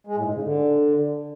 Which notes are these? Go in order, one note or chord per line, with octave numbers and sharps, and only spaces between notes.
G#3
A2
G#2
C#3
D3